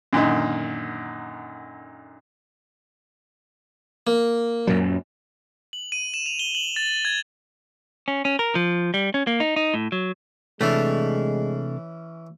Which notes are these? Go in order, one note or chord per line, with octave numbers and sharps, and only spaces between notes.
F#2 A#2 D3 D#3
A#3
F#2 A#2 F#3
F#7
D#7
E7
F7
G7
F#7
A6
G#6
C#4
C#4
A#4
F3
G3
C#4
A#3
D#4
D#4
A2
F#3
C3 E3 G#3 A3 C#4 D4 E4 C#5